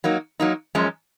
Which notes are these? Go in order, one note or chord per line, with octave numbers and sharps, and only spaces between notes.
F#3 A#3 D#4
F#3 A#3 D#4
F#2 F3 G#3 C#4